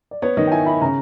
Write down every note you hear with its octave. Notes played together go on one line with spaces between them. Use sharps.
D5
B3 C#5
D#3 D#5
G5
E4 G#5
E4 B5
C#3 A#5